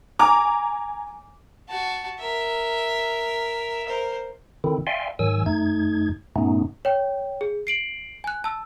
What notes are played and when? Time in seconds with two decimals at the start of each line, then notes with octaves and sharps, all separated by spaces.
0.19 G#5 A#5 D6
1.69 F#4 A5
2.20 A#4 E5
3.86 A#4 C5
4.64 D3 D#3 C4 E4
4.87 D5 E5 F5 G5 G#5 C6
5.19 G#2 D#3 F#3 G#5 E6
5.46 F#2 A3 D#4 G#6
6.36 G2 A#2 A3 B3 C#4 D#4
6.85 C#5 G5
7.41 G#4
7.67 C7 D7 F#7
8.24 G#5 F#6
8.44 A5 E6